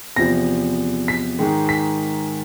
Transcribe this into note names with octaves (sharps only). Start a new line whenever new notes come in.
E2 C3 F3 A#6
B6
G#2 D#3 G#3
B6